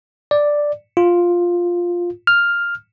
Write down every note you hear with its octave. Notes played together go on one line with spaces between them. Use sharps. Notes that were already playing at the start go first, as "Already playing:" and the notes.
D5
F4
F6